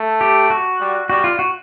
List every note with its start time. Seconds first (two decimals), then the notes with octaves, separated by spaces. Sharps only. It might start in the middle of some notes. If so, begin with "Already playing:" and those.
Already playing: A3
0.21 G4
0.50 F#4
0.80 G3
1.10 G3 F#4
1.24 F4
1.39 F#4